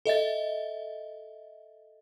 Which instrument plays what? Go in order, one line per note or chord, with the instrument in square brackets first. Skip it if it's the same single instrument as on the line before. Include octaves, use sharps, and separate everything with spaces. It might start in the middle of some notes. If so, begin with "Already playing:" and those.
[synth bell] A4 D#5 E5 A6